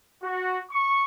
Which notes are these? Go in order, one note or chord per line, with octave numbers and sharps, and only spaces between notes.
F#4
C#6